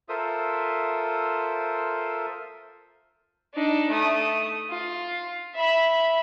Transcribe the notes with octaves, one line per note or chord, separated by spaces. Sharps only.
F4 A4 A#4 C5 E5 D#6
D4 D#4
A3 D#6
F4
E5 B5